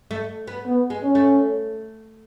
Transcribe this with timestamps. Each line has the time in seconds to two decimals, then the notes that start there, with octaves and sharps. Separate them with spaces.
0.11 A3
0.47 B3
0.66 B3
0.90 G#3
1.04 C#4
1.15 A3